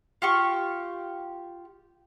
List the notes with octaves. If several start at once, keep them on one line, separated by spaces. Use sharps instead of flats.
F4 G4 C#6